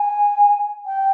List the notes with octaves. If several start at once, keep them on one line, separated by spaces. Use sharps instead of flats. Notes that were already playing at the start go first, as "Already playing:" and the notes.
Already playing: G#5
G5